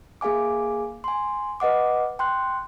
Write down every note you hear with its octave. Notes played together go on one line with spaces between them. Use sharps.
A#3 G#4 F5 G#5 D6
G#5 C6
B4 D#5 F#5 D6
G5 C6 F#6